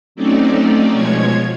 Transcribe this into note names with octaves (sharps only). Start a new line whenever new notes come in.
F#3 A3 C4 C#4 D#4 D5
B2 F3 G#3 C#5 G#6